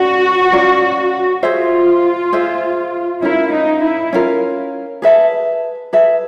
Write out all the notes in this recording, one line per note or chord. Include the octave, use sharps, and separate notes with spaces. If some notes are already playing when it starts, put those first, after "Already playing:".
Already playing: C#4 F#4 A#4 D5
C#4 F4 A#4 D5
F4 G#4 C5 E5
G#4 C5 E5
C#4 E4 F4 A#4
D#4
E4
C#4 F4 A#4
G#4 B4 E5 A5
G#4 B4 E5 A5